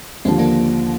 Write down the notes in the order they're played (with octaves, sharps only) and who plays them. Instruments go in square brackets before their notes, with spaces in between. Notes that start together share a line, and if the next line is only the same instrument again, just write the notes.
[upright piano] D#2 D3 F3 [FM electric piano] G#3 C4
[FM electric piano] A#3 D4